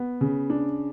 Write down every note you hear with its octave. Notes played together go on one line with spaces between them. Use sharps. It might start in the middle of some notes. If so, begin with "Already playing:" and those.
Already playing: B3
C#3
D4